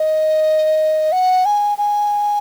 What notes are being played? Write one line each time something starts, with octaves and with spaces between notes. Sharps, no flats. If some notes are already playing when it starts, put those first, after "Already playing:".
Already playing: D#5
F#5
G#5
G#5